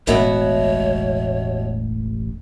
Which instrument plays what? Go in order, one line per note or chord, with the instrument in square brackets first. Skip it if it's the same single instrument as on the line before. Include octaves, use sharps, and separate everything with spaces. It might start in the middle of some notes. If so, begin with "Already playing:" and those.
[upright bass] E1 G#3 [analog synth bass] A1 [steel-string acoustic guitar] B2 E5 F#5 [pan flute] C#5